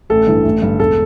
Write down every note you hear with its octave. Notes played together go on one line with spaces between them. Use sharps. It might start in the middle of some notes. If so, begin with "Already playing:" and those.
A1 A4
G2 E3
A1
G2 D3
E1 A4